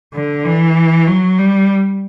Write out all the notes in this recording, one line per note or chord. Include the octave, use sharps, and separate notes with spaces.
D3
E3
F#3
G3